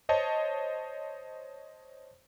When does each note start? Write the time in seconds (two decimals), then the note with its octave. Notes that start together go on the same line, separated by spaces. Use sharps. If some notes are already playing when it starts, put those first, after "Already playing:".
0.09 C5 C#5 D#5 A5